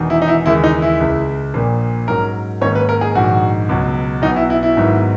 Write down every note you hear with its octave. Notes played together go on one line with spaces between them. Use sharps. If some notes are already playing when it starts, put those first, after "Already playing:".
Already playing: E1 E2 D#3
E4
D#4
E4
D#2 C#3 E3 G#3 E4
D#4
E4
C#2 C#3 G#3
A#1 A#2 A#3
G#2 F#3 C#4 A#4
G#2 D#3 A#3 C#4 C#5
B4
A#4
G#4
A#1 G#2 D#3 F#4
C#2 B2 F#3
B1 B2 F#3 B3 D#4
E4
E4
E4
G#1 G#2 D#3 F#3 B3